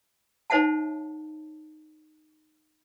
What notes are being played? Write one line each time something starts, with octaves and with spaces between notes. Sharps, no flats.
D#4 C5 C#5 E5 F#5 A5